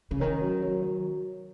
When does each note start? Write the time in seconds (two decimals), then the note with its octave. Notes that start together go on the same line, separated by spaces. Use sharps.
0.11 C#3
0.20 D#3 C#4
0.41 F#3
0.62 F#3
0.82 F#3